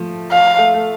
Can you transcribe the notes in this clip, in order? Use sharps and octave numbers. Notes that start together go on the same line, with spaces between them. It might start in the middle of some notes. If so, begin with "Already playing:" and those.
Already playing: F3 A3
F5
A3
A3